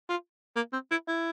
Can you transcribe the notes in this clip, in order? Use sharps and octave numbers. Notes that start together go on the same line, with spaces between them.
F4
A#3
C4
E4
E4